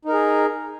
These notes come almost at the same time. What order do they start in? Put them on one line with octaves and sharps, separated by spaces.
D#4 A#4 G#4